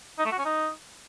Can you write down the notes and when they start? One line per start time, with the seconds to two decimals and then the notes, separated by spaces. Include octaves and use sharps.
0.18 D#4
0.25 A3
0.32 F#4
0.38 C#4
0.45 D#4